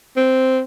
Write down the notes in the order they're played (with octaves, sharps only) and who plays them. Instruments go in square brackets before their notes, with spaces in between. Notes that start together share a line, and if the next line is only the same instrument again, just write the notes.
[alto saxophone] C4